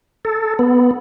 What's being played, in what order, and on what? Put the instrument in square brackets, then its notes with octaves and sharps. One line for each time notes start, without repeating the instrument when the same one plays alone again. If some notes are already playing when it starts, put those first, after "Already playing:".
[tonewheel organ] A4
B3